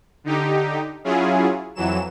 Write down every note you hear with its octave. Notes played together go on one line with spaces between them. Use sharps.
D3 D#4 G4
F#3 C#4 E4 F4 G#4
F2 E3 F#3 E7